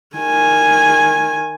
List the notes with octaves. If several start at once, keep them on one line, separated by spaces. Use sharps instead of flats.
D#3 G#5